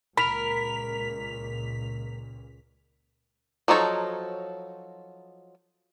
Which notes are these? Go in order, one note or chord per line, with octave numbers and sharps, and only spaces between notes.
C#2 A#2 A#4 B5 B6 F7
F3 F#3 D#4 A4 C#5